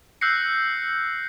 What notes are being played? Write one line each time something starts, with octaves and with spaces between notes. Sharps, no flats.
E6 F#6 G6 A#6 C7 C#7